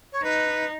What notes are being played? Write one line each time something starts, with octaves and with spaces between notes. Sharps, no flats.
C#5
D#4 B4